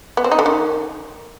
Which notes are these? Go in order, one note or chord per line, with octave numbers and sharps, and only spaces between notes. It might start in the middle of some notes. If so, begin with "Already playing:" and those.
B3
C4
D#4
D3
D#3